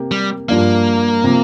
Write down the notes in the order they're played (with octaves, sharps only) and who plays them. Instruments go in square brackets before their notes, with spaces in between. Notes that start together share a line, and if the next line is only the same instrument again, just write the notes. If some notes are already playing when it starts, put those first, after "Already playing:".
Already playing: [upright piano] C3 A#3 G4
[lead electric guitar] G3
[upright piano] G2 F3 D4 F4 [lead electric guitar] A#3
[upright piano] C3 F3 C4